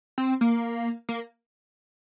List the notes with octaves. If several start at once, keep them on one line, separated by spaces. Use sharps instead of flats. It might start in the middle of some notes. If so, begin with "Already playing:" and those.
C4
A#3
A#3